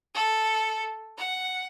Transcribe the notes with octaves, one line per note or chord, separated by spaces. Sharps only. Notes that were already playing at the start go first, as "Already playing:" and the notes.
A4
F#5